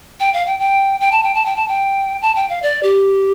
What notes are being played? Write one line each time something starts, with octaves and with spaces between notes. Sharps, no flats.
G5
F5
G5
G5
G5
A5
G5
A5
G5
A5
G5
A5
G5
F5
D5
G4